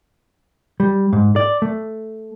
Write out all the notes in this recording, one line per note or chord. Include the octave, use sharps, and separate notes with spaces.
G3
G#2
D5
A3